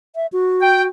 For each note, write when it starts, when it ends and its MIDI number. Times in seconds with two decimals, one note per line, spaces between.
0.16 0.27 76
0.32 0.88 66
0.62 0.83 79